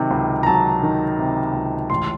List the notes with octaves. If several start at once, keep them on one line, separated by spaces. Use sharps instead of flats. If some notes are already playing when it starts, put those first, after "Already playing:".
Already playing: C3 D#3 F#3
C#2
A#5
F#3 A5
D#3
C3
C#2
A1 C6